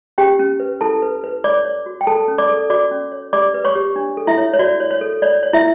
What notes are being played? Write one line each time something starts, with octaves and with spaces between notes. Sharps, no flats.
C#4 G4 G5
C#4
B4
E4 A4 A5
B4
B4
C#5 D5 D6
C#5
F#4
G5
A4 A5
C#4
D5 D6
A4
F#4 D5 D6
C#4
C#5
G4 D5 D6
B4
C#5 C#6
G4
D4
A4
E4 E5
C#5
C#5
F#4 D5
C#5
C#5
A4
C#5 D5
C#5
E4 E5